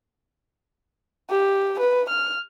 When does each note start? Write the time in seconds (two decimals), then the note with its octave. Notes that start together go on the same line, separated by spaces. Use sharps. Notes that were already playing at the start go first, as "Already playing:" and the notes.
1.30 G4
1.80 B4
2.09 F6